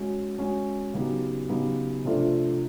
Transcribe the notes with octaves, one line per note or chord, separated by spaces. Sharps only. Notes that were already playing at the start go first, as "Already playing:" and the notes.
Already playing: G#3 C#4 F#4
G#3 C#4 F#4
C#3 F#3 B3 D#4 G4
C#3 F#3 B3 D#4 G4
C3 F3 A3 D4 F4